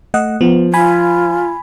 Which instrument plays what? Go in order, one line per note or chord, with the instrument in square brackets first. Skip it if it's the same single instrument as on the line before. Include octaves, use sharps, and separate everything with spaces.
[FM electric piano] A3 D#5 F#5
[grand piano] F3 [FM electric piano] B3
[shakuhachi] F4 [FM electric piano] G#5 B5